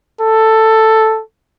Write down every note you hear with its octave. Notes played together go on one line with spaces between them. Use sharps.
A4